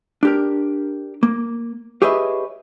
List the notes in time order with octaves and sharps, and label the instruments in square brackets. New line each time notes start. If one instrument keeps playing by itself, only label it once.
[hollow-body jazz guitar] D4 G4 A#4
A#3
G4 G#4 B4 C#5 D#5 E5